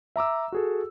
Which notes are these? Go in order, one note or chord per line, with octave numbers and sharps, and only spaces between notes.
E5 A#5 D6 E6
F#4 G#4 A4